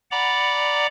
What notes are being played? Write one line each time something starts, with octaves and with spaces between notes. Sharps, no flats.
D5 F#5 A#5 B5 D6